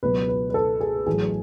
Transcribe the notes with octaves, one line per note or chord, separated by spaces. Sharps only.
C#2 B2 F#3 B4
B4
B4
A4
G#4
A1 A2 F#3 G#4